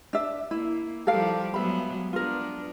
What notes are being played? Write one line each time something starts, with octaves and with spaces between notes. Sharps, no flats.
D4 E5
A#3 E4
F3 G3 G4 A4 A#4 F5
F#3 G#3 B3 E5 B5
B3 D4 F4 A#4